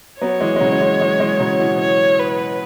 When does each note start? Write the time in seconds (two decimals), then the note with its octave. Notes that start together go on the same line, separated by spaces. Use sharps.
0.21 F#3 B3 C#5
0.41 E3 G#3
0.56 G#3
0.60 C#3 F#3
0.80 E3 G#3
1.00 E3 G#3
1.20 E3 G#3
1.40 C#3 F#3
1.59 B2 E3
1.80 C#5
2.19 B4